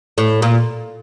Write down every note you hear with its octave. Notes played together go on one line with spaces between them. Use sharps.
A2
A#2